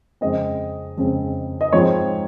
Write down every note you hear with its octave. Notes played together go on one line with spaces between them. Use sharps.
F2 C#3 G#3 C4 D#5
F2 C#3 G#3 C4
D#5
G#2 F3 G#3 C4 C#5